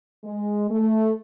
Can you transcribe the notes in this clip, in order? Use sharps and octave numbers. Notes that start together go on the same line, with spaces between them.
G#3
A3